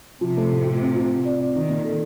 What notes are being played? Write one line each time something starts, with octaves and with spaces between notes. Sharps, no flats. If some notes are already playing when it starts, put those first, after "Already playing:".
C3 F3
A3
A2
F4
C4
F4
C4
D5
D5
D#3 D#4
A#2
A4